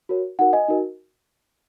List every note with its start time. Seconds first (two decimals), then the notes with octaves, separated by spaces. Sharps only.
0.09 F#4 A#4 C#5
0.39 D#4 F#4 A#4 F#5
0.53 D#5 G#5
0.68 D#4 F#4 A#4